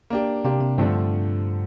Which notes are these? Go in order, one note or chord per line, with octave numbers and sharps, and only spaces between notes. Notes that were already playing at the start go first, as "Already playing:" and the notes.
A#3 D4 G4
C3 A#3 D4 G4
C3
G2 D3 F3 A3 C4